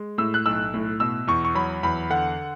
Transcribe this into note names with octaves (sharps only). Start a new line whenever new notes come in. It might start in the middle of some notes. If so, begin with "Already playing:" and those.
Already playing: G#3
A2 E6
F#6
B1 E6
A2
B2 E6
E2 C#6
C#6
F#3 B5
E2 B5
D3 F#5